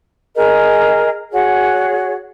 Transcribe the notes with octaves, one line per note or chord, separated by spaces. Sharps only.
G#4 A#4 D#5
F#4 G#4 C#5